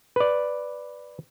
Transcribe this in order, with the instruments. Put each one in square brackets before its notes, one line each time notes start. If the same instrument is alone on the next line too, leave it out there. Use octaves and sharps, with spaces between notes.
[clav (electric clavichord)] B4 D5